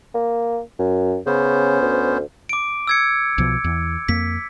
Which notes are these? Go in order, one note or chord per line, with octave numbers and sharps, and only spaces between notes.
A#3
F#2
C#3 B3 C#4 C5
D2
D6 D7
E6 G#6 C#7
B1 B2 F3
E2
F2 A#3 B6